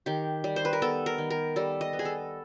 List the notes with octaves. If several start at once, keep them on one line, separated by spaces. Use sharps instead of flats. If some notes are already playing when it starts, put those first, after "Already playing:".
D#3 G4
G3
C5
B4
A#4
B3 A4
A#4
D#3
A#4
G3 A4
D#5
B3
G#4
A4